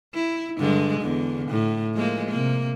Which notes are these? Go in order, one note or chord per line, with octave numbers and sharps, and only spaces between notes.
E4
G2 D3 G#3
E2 D3
A2
F3 G#3 A#3
C3 A#3